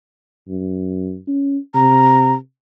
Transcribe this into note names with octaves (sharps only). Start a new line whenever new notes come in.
F#2
C#4
C3 A#5